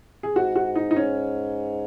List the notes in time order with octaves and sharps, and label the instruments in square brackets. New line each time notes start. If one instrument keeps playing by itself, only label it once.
[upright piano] G#4
[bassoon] G#2 [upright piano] F#4
[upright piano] F#4
D#4
D#4
C#4